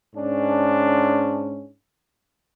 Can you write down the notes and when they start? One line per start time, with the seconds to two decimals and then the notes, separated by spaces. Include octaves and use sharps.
0.16 G#2 C#4 D4